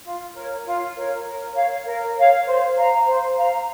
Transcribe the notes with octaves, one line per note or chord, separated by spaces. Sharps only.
F4
A#4 C#5
F4
A#4 C#5
A#4
C#5 F5
A#4
C#5 F5
C5
F5 A#5
C5
F5 A#5